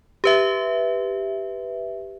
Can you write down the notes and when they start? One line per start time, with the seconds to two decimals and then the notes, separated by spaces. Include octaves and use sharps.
0.24 G4 B4 E5